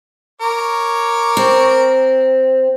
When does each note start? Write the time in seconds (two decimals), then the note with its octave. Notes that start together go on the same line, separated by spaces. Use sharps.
0.41 A#4 C#5 D6
1.37 C4